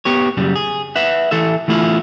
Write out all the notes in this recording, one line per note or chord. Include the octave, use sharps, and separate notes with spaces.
B3 G4 C#5
F#2 C#3 G3
G#4
B4 E5 F#5
E3 A4 E5
E3 A3 B3 E4 F4